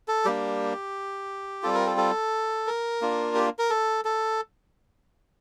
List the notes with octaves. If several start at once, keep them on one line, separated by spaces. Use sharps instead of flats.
A4
G3 A#3 D4 G4
G3 C4 F4 A4
A#4
A4
A4
A#4
A#3 D4 F4
G4
A#4
A4
A4